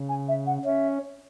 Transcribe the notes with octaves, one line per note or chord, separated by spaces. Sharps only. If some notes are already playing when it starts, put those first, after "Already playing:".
Already playing: C#3
G#5
E5
F#5
C#4 E5